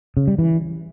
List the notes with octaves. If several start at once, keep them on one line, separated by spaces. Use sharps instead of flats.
C#3
G3
E3